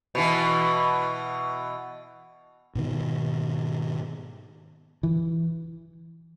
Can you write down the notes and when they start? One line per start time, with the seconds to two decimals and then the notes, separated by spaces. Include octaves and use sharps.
0.15 B2 E3
2.75 G#2 B2 D#3
5.03 E3